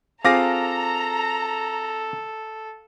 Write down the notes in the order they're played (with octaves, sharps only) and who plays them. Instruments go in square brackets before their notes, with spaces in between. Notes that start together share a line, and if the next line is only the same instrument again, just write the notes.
[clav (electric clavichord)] C4 F4 G#4 [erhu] A4 [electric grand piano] F5 D6 A#6 [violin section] A#5